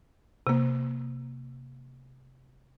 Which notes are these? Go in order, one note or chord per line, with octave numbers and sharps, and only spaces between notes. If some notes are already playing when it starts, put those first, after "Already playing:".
C3 A#3